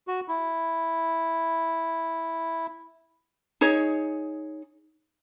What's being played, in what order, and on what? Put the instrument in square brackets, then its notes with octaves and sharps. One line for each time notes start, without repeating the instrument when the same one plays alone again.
[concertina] F#4
E4
[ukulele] D#4 G#4 C#5